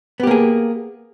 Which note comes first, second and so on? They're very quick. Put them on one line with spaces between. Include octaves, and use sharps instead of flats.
B3 G4 A#3 G#4